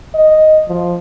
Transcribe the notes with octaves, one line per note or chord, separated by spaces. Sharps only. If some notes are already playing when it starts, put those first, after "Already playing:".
D#5
F3